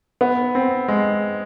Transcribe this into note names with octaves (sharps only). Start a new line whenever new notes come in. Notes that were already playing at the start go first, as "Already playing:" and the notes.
B3
C4
G#3